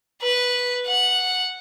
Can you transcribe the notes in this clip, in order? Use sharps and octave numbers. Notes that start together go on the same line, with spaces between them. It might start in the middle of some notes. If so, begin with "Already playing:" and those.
B4
F#5